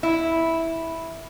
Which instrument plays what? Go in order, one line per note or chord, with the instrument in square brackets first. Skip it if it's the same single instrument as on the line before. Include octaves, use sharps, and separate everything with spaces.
[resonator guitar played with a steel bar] E4